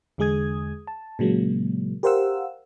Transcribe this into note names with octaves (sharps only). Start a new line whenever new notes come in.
E2 D3 G#3 G#4 D#6 G#6
A5
A#2 C#3 F#3 G#3 A#3
G4 A#4 C5 F5 F#5 E6